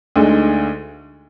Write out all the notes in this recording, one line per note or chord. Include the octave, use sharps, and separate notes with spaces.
D2 D3 G#3 D#4